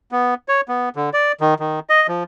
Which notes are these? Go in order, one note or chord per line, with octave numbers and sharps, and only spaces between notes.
B3
C#5
B3
D3
D5
D#3
D#3
D#5
F3